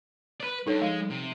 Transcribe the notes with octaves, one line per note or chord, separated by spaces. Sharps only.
B4 D5
G2 D#4 A4 C#5
F3 G#3 F5
C3